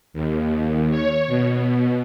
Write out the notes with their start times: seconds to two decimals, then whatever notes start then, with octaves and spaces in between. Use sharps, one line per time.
0.13 D#2
0.91 C#5
1.27 B2